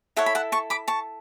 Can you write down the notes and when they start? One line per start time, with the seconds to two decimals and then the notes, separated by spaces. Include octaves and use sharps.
0.17 E4 A4 C#5 F#5
0.26 B5
0.35 F#5 A5
0.52 A5 C#6
0.70 B5 D6
0.88 A5 C#6